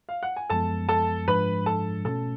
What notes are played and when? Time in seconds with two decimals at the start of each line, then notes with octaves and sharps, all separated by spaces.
0.09 F5
0.23 F#5
0.36 G#5
0.50 F#2 F3 G#3 B3 A4 A5
0.89 A4 A5
1.27 G#2 F3 G#3 D4 B4 B5
1.66 A4 A5
2.05 B2 A3 C#4 A4 A5